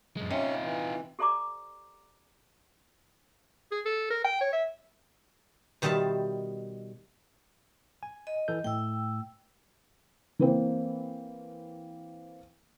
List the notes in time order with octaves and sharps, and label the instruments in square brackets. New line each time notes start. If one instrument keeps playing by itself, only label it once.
[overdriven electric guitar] F#2 G#3
[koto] C3 [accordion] C#4 [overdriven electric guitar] D#4 F4
[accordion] E3
[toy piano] G4 A4 C5 D5 A#5 D6
[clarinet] G#4
A4
A#4
G5
C#5
E5
[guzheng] B2 D#3 G3 C5 E5 A5
[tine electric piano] G#5
[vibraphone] D#5
[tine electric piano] E3 A4 G6
[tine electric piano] A2 A3 [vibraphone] G5 E6
[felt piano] E3 A#3 C4